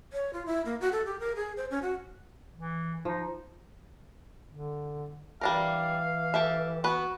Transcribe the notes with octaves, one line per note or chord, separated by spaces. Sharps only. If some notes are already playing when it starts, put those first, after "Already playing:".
C#5
F4
E4
A#3
F#4
A4
G4
A#4
G#4
C5
C#4
F#4
E3
F3 D#4
D3
E3 G3 D4 A#4 F5
G4 A4 E5
B3 F#4 B4